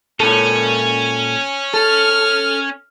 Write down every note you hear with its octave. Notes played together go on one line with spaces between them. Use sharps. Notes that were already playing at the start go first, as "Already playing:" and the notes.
A#2 C#4 A4
A4 F6